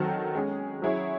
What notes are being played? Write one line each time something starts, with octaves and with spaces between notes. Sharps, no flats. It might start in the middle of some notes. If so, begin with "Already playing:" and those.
Already playing: D#3 F#3 C4 F#4 A4
G#3 C#4 G#4
F#3 C#4 E4 G#4 C#5